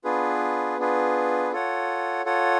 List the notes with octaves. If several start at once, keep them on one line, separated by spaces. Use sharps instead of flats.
B3 D4 F4 G#4 B4
B3 D4 F4 G#4 B4
F4 A4 C#5 F#5
F4 A4 C#5 F#5